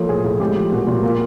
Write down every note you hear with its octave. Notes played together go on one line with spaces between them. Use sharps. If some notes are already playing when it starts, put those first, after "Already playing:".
Already playing: F3 A#3 A4 C#5
A2 G#4
A2 G#4
G#3 G4
F3
A#2 F#4
A#2
A#3 F4